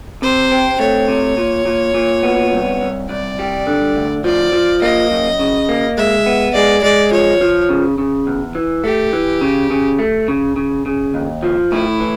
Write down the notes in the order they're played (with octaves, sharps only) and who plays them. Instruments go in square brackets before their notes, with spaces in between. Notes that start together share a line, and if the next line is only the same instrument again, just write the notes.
[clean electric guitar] C3 [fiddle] C5
[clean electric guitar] C4
[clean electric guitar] A3 [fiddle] C#5
[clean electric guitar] C3
A#2
A#2
A#2
B3
C2
C2
[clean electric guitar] C2 [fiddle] D5
[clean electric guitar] G3
D3
D2
[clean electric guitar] F3 [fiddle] D5
[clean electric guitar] F3
[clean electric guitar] A#3 [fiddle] D#5
[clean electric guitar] F#2
C#3
A#3
[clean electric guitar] G#3 [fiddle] E5
[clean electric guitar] B3
[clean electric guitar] G#3 [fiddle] D5
[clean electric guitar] G#3 [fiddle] D5
[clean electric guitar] F3 [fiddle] C#5
[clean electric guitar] F3
C#3
C#3
E2
E3
[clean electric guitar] A3 [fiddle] G4
[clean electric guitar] E3
C#3
C#3
A3
C#3
C#3
C#3
D#2
F3
[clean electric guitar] A2 [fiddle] E4
[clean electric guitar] E3